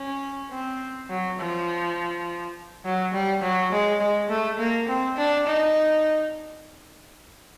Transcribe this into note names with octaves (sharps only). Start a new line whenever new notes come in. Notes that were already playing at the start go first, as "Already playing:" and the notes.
Already playing: C#4
C4
F#3
F3
F#3
G3
F#3
G#3
G#3
A3
A#3
C4
D4
D#4